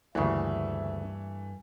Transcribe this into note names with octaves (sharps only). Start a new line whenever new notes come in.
D2 G2 C#3 E3 A3 A#3 E5